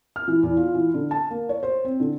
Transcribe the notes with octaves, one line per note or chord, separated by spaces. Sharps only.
F6
E3
E2
F4
E3
D3
A5
A#3
C#5
C5
C4
D3